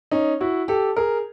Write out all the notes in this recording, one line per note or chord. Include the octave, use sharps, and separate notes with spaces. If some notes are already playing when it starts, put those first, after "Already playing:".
C#4 D#4
E4 F#4
G4 A4
G#4 A#4